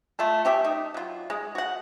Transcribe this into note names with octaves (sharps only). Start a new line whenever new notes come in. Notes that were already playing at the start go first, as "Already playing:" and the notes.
A3 F4 A4
C#4 G4 E5
D#4
F#3 F4
G#3
F#4 F#5